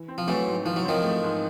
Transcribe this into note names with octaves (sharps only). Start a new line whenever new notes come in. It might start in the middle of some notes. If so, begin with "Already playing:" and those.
Already playing: E3
C4
F3
E3 F#3 A3
G#2
E3 F3
F#3
D#3 F3 C4
A3
G#2